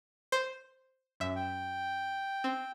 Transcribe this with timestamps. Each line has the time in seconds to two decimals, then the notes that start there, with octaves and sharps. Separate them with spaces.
0.32 C5
1.20 F#2 E5
1.36 G5
2.44 C4